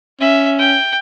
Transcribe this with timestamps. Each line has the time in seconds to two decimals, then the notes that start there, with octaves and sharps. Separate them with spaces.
0.21 C#4 E5
0.59 G5